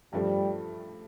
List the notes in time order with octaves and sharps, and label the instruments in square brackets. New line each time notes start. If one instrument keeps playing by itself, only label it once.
[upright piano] G2 F3 A3 [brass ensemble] G3